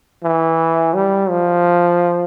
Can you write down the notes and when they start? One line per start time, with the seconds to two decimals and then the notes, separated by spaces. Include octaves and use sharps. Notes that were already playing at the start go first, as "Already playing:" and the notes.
0.23 E3
0.94 G3
1.30 F3